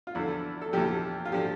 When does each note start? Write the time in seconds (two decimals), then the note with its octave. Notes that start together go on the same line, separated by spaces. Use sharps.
0.07 F4
0.15 E2 D3 F3 E4
0.62 A4
0.73 E2 D3 F3 G4
1.25 F4
1.32 D3 F3 G4